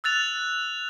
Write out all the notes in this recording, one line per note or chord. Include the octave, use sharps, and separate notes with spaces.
E6 F#6 A6 F7